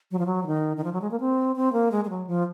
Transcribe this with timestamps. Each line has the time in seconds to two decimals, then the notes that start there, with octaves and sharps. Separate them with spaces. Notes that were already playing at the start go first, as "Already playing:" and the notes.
0.11 F#3
0.19 F3
0.26 F#3
0.43 F3
0.47 D#3
0.77 D#3
0.84 F3
0.93 F#3
1.02 G#3
1.11 A#3
1.20 C4
1.56 C4
1.73 A#3
1.92 G#3
2.05 G#3
2.10 F#3
2.27 F3